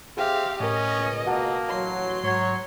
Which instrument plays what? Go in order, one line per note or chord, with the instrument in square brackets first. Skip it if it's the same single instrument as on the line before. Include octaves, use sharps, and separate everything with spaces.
[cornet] C4 [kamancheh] G4 F5 [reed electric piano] G#4 E5
[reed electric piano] A2 A#4 [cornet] C#4 [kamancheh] D#5
[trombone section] C#2 B2
[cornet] A#3 [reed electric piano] F#4 F#5 A5
[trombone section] A1 F#3 [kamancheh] C6
[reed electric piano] G#2 G#6 [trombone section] F#3 [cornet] C#5